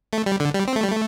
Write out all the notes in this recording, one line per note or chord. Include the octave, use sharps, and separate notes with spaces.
A3
G3
D3
G3
C4
A3
G3
A3